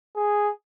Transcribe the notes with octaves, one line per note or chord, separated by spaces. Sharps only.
G#4